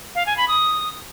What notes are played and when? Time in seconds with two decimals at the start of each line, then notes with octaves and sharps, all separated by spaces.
0.15 F5
0.26 G#5
0.37 B5
0.48 D#6